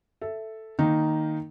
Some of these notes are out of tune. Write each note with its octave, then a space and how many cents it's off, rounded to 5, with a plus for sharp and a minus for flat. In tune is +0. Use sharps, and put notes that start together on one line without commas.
A4 +0 E5 +0
D#3 +0 A#3 +0 D#4 +0